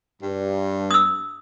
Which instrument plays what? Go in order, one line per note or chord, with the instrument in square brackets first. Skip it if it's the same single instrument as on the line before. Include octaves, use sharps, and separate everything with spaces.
[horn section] G2
[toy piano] D#6 E6